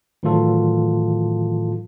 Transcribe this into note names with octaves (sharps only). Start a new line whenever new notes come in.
A2 D#3 E3 F#3 F4 A4